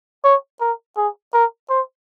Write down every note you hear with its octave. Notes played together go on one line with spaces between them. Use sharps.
C#5
A#4
G#4
A#4
C5